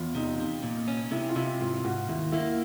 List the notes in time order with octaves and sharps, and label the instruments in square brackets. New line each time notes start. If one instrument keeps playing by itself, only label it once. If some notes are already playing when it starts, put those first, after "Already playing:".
Already playing: [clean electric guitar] E2 [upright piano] F4
[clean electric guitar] C3 [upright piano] D#4
[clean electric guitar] C3
A#2
C#4
[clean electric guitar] C3 [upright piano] E4
[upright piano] F4
[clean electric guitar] C3 [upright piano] E4
[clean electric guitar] G#2 [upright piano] F4
[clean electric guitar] G#2 [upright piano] F#4
[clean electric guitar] D#2 [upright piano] E4
[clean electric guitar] A#3 [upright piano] E4